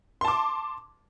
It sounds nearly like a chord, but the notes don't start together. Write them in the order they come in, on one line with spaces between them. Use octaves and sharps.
C6 A5 D6